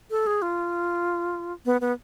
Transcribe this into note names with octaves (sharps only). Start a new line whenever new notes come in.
A4
G#4
F4
B3
B3